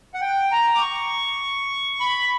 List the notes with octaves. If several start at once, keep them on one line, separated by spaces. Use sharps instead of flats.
F#5
G5
A#5
D6
C#6
B5